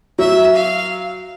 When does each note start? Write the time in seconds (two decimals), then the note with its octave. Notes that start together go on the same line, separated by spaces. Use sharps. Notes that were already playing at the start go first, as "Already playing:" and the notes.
0.19 F#3 E5
0.55 F5